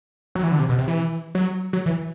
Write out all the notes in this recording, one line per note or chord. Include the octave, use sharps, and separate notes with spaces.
F#3
E3
D3
C3
B2
C3
E3
F#3
F#3
E3